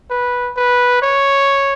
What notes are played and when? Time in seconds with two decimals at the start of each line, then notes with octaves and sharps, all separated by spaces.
0.10 B4
0.57 B4
1.02 C#5